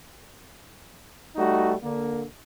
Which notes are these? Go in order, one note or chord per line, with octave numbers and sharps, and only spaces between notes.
G3 A3 D#4 F#4
D3 A#3